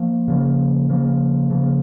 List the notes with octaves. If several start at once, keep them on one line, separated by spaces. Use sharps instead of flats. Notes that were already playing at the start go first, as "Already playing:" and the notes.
Already playing: F3 A#3
C#3 F3 A#3
C#3 F3 A#3
C#3 F3 A#3